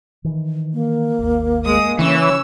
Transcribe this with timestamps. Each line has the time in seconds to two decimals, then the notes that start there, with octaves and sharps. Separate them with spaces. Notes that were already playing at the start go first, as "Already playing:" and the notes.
0.24 D#3 E3
0.74 A#3
1.19 G#1 D#2
1.66 G#3 D#6
1.99 C#3 E3 C#4 C#5 E6